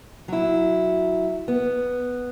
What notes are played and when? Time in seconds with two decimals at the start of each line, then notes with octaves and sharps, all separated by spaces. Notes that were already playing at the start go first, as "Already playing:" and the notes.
0.28 F#3 E4
1.48 B3